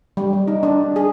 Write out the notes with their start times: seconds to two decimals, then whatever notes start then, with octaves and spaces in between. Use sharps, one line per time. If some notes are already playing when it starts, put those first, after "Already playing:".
0.17 G3
0.33 G3
0.48 D#4
0.63 D4
0.96 G#4